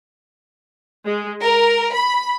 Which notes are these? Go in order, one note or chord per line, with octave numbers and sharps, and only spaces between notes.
G#3
A#4
B5